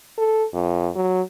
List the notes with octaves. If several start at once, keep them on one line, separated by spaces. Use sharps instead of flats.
A4
F2
F#3